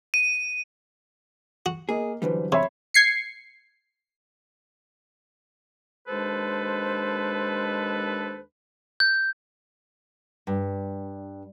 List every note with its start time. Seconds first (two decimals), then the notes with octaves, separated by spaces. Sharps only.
0.14 D#7
1.66 F#4
1.89 A#3 G#4 D#5
2.22 F#2 D3 E3 G3 B4 C5
2.52 C3 C#5 E5 B5 C6
2.94 G#6 C7 C#7
6.08 D#2 G#3 D4 A4 B4 C5
9.00 G6
10.47 G2